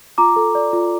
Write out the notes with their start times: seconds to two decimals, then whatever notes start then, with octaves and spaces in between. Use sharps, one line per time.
0.18 F4 A#5 D6
0.36 A4
0.55 D5
0.73 F4